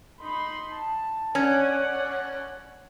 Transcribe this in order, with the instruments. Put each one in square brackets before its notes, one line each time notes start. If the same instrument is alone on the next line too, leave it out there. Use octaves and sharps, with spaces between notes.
[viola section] D#4 B5 C6
A5
[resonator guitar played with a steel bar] C#4 [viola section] D5 F#5